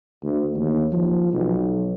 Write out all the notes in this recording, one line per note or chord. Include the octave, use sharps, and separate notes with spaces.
D2
D#2
F3
B1